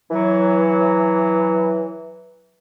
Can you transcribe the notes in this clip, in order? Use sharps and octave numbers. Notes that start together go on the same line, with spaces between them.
E3 F#3